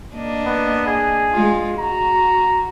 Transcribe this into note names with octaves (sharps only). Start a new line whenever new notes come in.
A#3 D4 D#5
B3
G#4
G#3 F4
F#4 A#5